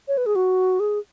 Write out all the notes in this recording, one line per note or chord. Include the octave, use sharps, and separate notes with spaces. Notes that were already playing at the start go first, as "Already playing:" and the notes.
C#5
B4
G#4
F#4
G#4